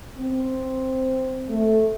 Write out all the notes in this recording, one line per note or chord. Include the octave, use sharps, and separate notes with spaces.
C4
A3